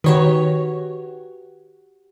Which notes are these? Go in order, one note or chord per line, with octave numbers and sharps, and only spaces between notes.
D#3 F#4 G4 B4 C#5